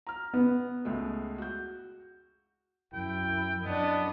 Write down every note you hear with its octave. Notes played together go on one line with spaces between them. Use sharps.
A#5 F6
B3
C#2 G#3 A3
F#4 G6
F#2 E4 G5
F#2 B3 D4 D#5